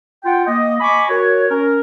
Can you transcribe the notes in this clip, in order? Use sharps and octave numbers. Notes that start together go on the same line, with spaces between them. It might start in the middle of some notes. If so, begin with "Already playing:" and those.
F4 F#5 G5
A#3 D#5
D#5 G#5 B5 C#6 D6
F#4 A#4 C#5
C#4 A#4